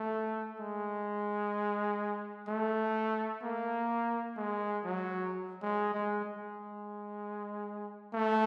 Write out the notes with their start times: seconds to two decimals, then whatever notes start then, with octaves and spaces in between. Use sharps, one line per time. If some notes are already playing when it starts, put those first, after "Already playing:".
Already playing: A3
0.60 G#3
2.48 A3
3.42 A#3
4.36 G#3
4.84 F#3
5.62 G#3
5.94 G#3
6.25 G#3
8.13 A3